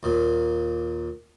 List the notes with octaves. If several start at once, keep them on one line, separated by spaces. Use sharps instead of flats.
D#2 A#2